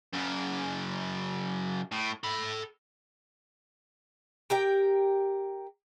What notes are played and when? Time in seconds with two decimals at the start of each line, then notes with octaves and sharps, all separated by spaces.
0.13 F#2 C#3
1.92 A2
2.23 A4 B5
4.50 G4 A#4 G5